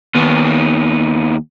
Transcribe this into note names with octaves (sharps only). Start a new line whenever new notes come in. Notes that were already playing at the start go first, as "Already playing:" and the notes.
D#2 B3